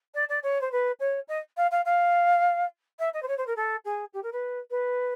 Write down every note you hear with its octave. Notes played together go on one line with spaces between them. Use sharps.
D5
D5
C#5
C5
B4
C#5
D#5
F5
F5
F5
E5
D#5
C5
C#5
C5
A#4
A4
G#4
G4
A#4
B4
B4